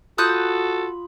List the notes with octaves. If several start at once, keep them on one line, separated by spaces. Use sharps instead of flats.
F4 F#4 A4 B5 D#6 F#6 G6